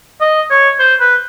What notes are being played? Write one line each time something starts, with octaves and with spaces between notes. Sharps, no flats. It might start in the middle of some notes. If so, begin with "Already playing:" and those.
D#5
C#5
C5
B4